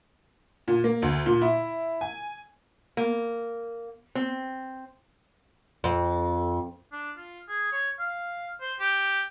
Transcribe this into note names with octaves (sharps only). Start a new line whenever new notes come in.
A#2
A#3
D2
A#2
E4
G#5
A#3
C4
F2
D4
F4
G#4
C#5
F5
C5
G4